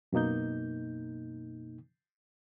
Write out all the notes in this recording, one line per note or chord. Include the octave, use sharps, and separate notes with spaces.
F#2 B2 A#3 D#4 G6